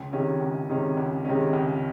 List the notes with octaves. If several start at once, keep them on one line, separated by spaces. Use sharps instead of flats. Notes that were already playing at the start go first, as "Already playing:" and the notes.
Already playing: C#2
C3 D#3 G#3 C#4
C#2
C3 D#3 G#3 C#4
C#2
C3 D#3 G#3 C#4
C#2